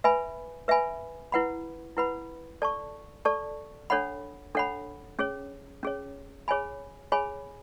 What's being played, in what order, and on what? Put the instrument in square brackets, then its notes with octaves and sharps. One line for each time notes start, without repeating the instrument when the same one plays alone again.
[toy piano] B4 E5 G#5 B5
B4 E5 G#5 B5
E4 B4 F#5 B5
E4 B4 F#5 B5
A4 D5 A5 C#6
A4 D5 A5 C#6
D4 A4 C#5 F#5 B5
D4 A4 C#5 F#5 B5
C#4 G#4 C#5
C#4 G#4 C#5
G#4 C#5 G#5 B5
G#4 C#5 G#5 B5